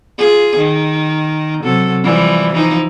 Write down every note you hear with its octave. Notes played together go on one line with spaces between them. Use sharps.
F4 G#4
D#3
C3 F#3 A4
E3 F3 G3
E3 F3 D#4